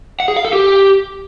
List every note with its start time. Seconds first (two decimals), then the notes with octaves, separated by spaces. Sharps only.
0.20 F#5
0.28 G#4
0.36 F5
0.45 A4
0.53 G4